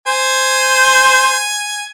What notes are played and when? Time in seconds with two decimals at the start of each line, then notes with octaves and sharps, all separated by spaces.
0.07 C5 G#5